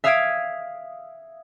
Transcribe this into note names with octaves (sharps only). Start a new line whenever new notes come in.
E5 F5 D#6 F6 G#6 D7